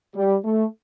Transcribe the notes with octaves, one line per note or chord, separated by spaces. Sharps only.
G3
A3